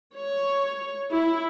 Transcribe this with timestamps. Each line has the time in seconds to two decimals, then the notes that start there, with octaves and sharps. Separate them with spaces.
0.16 C#5
1.13 E4